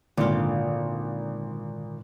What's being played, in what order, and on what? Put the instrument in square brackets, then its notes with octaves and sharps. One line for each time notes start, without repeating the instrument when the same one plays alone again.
[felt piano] G#1 [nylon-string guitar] A#2 F4 [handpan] D3